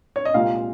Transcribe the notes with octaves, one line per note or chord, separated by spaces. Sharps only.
C#5
D#5
C2 A#2 G#3 F4 F5